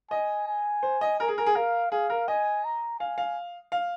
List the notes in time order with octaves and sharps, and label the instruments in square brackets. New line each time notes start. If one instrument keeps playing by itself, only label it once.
[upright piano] D#5 [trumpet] G#5
[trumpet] G#5
[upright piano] C5
D#5
[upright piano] A#4 [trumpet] G#5
[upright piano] G#4
A#4
G#4
[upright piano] A#4 [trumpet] F5
[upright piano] G#4 [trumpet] F5
[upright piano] A#4
[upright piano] D#5 [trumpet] G#5
[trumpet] A#5
[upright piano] F5 [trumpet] G#5
[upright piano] F5
F5